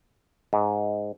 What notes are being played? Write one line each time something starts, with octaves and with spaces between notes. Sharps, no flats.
G#2